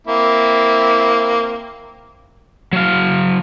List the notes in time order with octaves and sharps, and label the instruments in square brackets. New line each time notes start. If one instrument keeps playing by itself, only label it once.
[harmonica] A#3 C4 E4
[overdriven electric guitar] F#3 F5